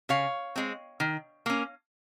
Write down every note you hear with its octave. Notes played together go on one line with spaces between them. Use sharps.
C#3 C#5 F5
G#3 C4
D#3
A#3 C#4